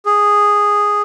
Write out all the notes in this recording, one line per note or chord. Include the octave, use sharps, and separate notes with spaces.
G#4